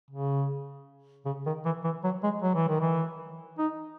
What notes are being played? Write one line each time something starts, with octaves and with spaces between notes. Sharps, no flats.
C#3
C#3
D#3
E3
E3
F#3
G#3
F#3
E3
D#3
E3
D#4